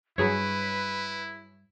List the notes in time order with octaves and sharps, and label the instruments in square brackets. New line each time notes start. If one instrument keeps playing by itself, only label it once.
[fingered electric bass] G2 [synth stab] F#3 G#4 C#5 [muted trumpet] E4 [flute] B4